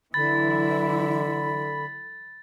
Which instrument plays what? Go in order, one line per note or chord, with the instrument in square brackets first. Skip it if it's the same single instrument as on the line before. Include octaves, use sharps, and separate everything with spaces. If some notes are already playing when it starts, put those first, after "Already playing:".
[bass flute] D3 [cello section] E3 F#3 E4 [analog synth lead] B5 [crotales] A6